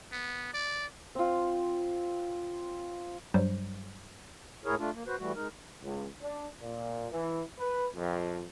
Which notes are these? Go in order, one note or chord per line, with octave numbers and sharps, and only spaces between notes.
B3
D5
C4 F4
G2 F#3 G3 C5
D2 A2 E4 G#4 A#4 C#5
A3 D4 F4
A#3
F#4 B4 C5
E3 G3 A3 F#4
G#3 D#4 A#4
C#2
D4
A#2
E3
B4
F2